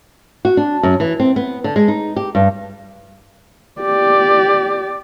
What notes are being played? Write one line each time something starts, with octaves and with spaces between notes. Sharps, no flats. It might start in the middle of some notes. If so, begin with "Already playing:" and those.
F#4
D4
F#2
E3
C4
B3
D3
G#3
D#4
G4
G2
G4 D5